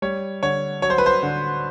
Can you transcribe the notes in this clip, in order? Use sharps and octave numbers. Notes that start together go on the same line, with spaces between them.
G3 C#5
D3 C#5
F#3 C#5
C5
B4
C5
D3